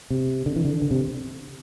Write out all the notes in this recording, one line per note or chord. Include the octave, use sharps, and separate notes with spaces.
C3
D3
E3
D3
D3
C3